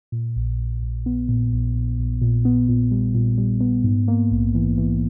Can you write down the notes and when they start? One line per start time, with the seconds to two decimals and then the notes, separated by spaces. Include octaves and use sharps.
0.12 A#2
0.36 A#1
0.59 A#1
0.83 A#1
1.06 B3
1.29 A#2
1.53 A#1
1.75 A#1
1.99 A#1
2.22 A#2
2.45 B3
2.69 A#2
2.91 G3
3.15 A#2
3.38 G3
3.61 B3
3.84 G#2
4.08 A#3
4.31 A#1
4.55 E3
4.78 E3